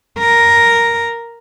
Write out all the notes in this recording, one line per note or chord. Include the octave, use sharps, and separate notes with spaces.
A#4